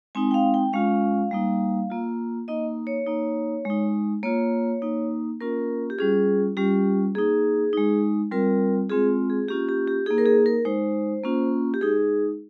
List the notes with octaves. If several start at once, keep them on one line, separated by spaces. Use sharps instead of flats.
G#3 C4 D#4 G#5
G5
F5
G5
G#3 C#4 F4 F5
G3 A#3 D#4
A#3 F4
A#3 D#4 D#5
C#5
A#3 D#4
G#3 D#4
A#3 F4 C#5
A#3 D#4
A#3 C#4 F4 A#4
G4
G3 C#4 F4 G#4
G3 C#4 F4 G4
A#3 D#4 G#4
G#3 D#4
G3 C4 F4 A#4
G#3 C4 F4 G#4
G#4
A#3 C#4 F4 G4
G4
G4
A#3 D#4 G#4
A#4
G#4
A#4
G#3 D#4 C5
A#3 C#4 F4
G4
G#3 D#4 G#4